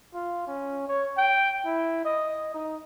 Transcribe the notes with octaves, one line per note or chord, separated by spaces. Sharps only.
F4
C#4
C#5
G5
E4
D#5
D#4